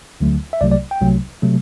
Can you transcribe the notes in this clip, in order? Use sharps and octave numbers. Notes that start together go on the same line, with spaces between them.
D2 D3 F#3 A3
E5
C2 C3 F#3 A3 D5
D5
G5
C2 C3 F#3 A3
C3 F#3 A3